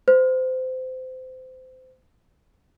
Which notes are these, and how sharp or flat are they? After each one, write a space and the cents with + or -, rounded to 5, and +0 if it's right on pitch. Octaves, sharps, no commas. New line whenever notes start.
C5 -25